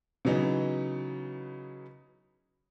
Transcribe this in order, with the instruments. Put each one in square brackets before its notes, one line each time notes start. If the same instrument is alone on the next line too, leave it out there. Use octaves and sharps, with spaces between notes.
[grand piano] C#3 E3 F#3 B3 D#4